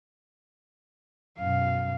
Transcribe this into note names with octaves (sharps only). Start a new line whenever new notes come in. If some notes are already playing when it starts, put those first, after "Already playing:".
F#2 B2 F5